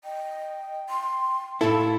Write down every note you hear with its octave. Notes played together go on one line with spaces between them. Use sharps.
D#5 G5
C6
A2 E4 A4 F5